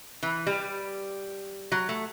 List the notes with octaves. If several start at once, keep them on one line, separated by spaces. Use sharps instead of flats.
E3
G3
F#3
A3